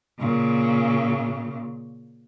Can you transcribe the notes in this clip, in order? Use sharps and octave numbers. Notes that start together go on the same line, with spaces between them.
A#2 C#3